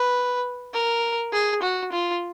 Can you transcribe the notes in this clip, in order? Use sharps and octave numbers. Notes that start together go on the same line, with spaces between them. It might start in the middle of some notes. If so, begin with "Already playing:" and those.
Already playing: B4
A#4
G#4
F#4
F4